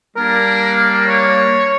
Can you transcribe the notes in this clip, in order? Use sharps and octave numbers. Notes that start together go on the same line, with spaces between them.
G3 A#3 D4 A#4
C#5